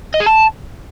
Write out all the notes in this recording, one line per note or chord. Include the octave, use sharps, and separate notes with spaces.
D#5
G#4
A5